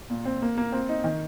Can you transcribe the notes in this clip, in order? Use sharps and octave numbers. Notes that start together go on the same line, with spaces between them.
A#2
C4
A#3
A#3
C4
D#4
D#3